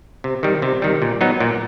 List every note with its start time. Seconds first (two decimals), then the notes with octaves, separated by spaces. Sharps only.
0.24 C3
0.43 D#3 G3
0.62 C3
0.82 D#3 G3
1.02 A#2
1.21 F#3 B3 D#4
1.40 A#2